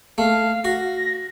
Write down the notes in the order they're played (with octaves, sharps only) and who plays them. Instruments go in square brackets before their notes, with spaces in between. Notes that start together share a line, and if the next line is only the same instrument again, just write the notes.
[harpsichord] A3 [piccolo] F5
[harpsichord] F#4 [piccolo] A#6